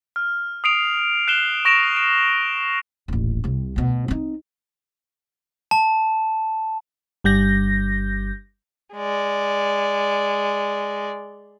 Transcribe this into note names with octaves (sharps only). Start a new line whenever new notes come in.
F6
D#6 C7 D7 F7
F#6 C7 E7 G7
C#6 A#6 D7 E7 F7
D7
D#1 A1
C2 C3
D2 B2
C4 D#4
A5
G1 G3 G6 A#6
G#3 D5